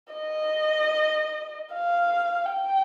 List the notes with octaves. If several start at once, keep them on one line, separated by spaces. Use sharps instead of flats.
D#5
F5
G5